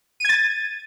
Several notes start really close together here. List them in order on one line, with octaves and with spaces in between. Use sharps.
D#7 G#6 A6